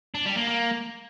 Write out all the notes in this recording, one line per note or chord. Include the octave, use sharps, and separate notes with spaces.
D4
G3
A#3
A#3